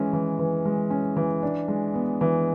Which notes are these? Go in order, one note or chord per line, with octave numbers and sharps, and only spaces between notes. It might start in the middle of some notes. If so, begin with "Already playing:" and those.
Already playing: E3 G#3 C#4
E3
E3
G#3
C#4
E3
D4
G#3
B3
E3